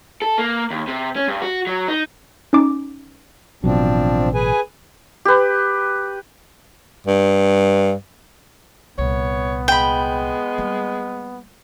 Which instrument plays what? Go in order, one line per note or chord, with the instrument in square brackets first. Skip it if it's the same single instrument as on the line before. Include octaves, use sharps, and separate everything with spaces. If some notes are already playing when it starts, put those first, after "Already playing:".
[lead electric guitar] A4
A#3
D#2
C3
C#4
G2
F#4
F#3
D#4
[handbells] C#4 D#4 D6
[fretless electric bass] A1 B2 F#3 [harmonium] F3 C4 D4
[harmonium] G#4 B4 G#5
[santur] G4 B4
[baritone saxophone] G2
[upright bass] C2 A#2 [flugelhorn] B3 [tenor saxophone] C#5
[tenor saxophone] G#3 [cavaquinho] G5 B5
[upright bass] G3 A#3